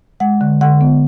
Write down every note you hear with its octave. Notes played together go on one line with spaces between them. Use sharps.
G#3 F#5
D3
D3 F#5
B3